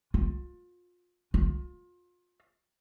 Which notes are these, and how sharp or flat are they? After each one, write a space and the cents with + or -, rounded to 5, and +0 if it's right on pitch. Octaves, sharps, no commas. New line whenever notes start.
F4 +30
F4 +30